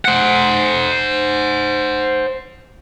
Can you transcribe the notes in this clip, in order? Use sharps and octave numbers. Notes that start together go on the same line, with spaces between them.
C5 F#5